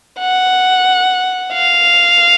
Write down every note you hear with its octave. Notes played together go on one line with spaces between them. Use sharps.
F#5
F5